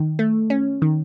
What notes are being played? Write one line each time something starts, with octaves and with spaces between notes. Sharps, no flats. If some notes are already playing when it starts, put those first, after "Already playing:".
Already playing: D#3
A3
C#4
D#3